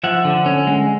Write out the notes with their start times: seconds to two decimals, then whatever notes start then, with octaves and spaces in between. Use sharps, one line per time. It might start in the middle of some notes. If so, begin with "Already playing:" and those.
0.03 F3 E5 F#5
0.25 D3
0.46 C#4
0.67 G#3